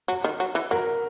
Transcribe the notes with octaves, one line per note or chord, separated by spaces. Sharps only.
F#3
D#3
F#3
E3
F#3 A#4